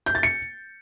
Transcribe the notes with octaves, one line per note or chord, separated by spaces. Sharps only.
G6
A6
C#7